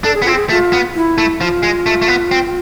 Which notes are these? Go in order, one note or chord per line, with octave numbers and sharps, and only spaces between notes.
D4 A4
G#4
B3
C4 F4
G#4
A3 F4
B3
E4
A3
F3 F4
G#3
A3
A3
B3
C4